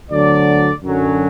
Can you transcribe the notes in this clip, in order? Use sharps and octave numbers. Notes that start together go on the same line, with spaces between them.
D2 D3 F#3 D5
F#2 D3 F#3 C#4